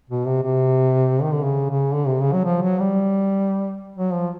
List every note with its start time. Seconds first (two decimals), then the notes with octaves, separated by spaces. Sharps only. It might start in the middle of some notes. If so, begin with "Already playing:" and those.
0.09 B2
0.25 C3
0.43 C3
1.22 D#3
1.33 D3
1.44 C#3
1.70 C#3
1.94 D3
2.07 C3
2.20 C#3
2.33 F#3
2.44 F3
2.62 F#3
2.79 G3
3.96 F#3
4.14 F3